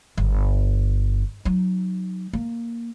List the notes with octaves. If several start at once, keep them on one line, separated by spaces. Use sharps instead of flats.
G1
F#3 D#4
A#3